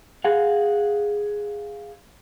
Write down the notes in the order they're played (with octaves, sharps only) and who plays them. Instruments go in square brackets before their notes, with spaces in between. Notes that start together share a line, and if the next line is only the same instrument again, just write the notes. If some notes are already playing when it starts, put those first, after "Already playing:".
[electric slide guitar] G#4 F5 F#5